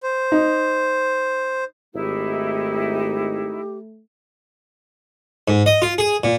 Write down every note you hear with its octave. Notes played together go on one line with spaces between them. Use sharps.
C5
D#4
G#1 A3 D#4 E4 G4
G#2
D#5
F4
G#4
A#2